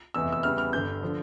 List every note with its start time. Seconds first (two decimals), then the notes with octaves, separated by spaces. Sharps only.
0.14 F1 E2 E3 E6
0.32 E6
0.43 E2 C#3 E3 G3 F6
0.58 F6
0.73 G1 G2 D3 G6
1.03 D3 F3